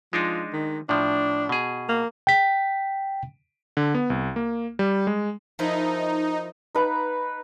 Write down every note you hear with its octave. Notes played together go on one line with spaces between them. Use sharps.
F3 G#3 D4 D#4
D#3
A2 F3 D4
B2 G#4
A#3
G5 B6
D3
B3
C2
A#3
G3
G#3
F3 D#4 E4 A#4
D#4 B4 A#5